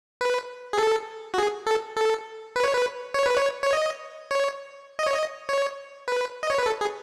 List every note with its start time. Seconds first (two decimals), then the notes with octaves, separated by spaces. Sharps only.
0.21 B4
0.73 G#4
0.78 A4
1.34 F#4
1.38 G#4
1.67 A4
1.97 A4
2.56 B4
2.63 C#5
2.73 B4
3.14 C#5
3.26 B4
3.37 C#5
3.62 C#5
3.73 D#5
4.31 C#5
4.99 D#5
5.06 C#5
5.14 D#5
5.49 C#5
6.08 B4
6.43 D#5
6.50 C#5
6.58 B4
6.66 A4
6.81 G#4